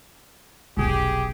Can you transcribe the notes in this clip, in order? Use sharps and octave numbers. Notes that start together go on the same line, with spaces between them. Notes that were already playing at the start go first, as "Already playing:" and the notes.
F1 B1 G4 G#4